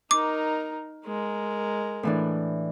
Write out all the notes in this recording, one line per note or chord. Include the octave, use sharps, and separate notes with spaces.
D#4 A#4 D6
G#3 A#4
A2 E3 D4